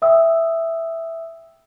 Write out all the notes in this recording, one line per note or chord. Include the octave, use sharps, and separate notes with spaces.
E5 G5 D#6 E6